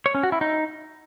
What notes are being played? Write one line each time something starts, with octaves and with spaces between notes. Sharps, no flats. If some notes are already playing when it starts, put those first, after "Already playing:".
C#5
C#4
F#4
E4
D#4